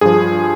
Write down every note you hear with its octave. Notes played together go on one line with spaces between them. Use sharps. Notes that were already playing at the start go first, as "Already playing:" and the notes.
G2 F3 G#4